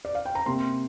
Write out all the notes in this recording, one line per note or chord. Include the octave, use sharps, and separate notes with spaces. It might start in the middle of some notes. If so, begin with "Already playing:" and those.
D5
F5
G5
A#5
C3 A#3 C6